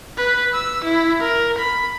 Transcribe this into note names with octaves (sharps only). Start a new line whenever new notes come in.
B4
E6
E4
A#4
B5